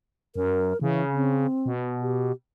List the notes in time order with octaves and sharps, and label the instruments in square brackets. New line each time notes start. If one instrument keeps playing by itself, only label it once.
[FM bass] F#2 [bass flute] A#4
[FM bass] C#3 [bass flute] E3
[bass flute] C4
[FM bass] B2
[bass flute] G4